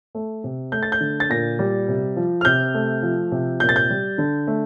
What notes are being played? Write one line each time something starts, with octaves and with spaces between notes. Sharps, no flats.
A3
C3
A3 G6
A6
G6
D3
A6
A#2 A#6
G3
C3
F3
F6
C3 G6
A3
F3
C3
A#2 G6
A6
G6
G3
D3
A3